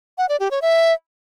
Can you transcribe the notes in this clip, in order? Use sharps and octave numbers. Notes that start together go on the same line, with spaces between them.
F#5
D5
G4
C#5
E5